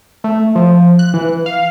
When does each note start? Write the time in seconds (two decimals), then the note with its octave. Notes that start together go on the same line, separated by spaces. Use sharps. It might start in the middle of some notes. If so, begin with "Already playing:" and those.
0.24 A3
0.55 F3
0.99 F#6
1.14 E3
1.46 F5